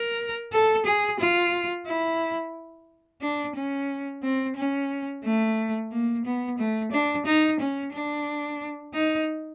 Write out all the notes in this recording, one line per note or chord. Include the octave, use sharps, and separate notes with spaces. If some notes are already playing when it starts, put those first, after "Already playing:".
Already playing: A#4
A4
G#4
F4
E4
D4
C#4
C4
C#4
A3
A#3
B3
A3
D4
D#4
C#4
D4
D#4